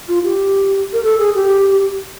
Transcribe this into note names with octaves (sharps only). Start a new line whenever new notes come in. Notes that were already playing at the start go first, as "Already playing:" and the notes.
F4
G4
A#4
A4
G#4
G4